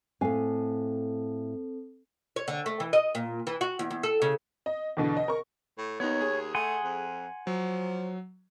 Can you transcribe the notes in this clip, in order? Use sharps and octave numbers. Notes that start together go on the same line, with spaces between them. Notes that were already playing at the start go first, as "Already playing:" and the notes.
A2 C4 A4 F5 G#5
C#5
D3
A3
E3
D#5
A#2
E3
F#4
E2
E2
A4
C#3
D#5
E2 B2 D3
D#5
A#4 C#6
A2
D#2 B3 D#4 C#5
G#4
A3 F#5 G#5 C6
F2
F3 F#3